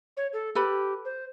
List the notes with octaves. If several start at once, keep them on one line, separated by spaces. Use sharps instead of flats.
C#5
A4
G4 A4 B4 B5
C5